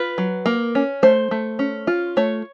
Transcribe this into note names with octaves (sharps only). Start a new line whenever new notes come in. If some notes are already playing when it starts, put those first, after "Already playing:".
Already playing: F4 B4
F#3
A#3
C#4
A3 C5
A3
C#4
F4
A3 C#5